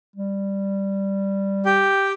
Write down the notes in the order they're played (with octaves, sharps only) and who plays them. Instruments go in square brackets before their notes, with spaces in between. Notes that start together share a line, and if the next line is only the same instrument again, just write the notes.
[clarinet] G3
[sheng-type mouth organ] G4 G5